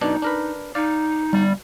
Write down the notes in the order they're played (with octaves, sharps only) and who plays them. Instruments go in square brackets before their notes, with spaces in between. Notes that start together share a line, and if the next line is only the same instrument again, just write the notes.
[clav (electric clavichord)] F#2 B2 D4 [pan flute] D#4
[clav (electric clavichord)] D4 A#4 B4
[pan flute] D#4 [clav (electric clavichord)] D5 F5
[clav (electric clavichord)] G1 [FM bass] G3